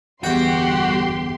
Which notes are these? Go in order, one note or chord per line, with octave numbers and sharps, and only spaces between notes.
G1 E2 F#4 G4 G5 C6